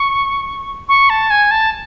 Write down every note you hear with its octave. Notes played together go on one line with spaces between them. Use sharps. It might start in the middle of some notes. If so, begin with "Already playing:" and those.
Already playing: C#6
C#6
A5
G#5
A5